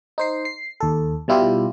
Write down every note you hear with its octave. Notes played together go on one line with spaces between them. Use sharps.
D#4 C5 C7
C7
D#2 A4
B2 G3 E4 F4 G4